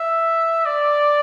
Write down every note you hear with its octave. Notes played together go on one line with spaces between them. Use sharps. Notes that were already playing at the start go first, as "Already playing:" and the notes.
Already playing: E5
D5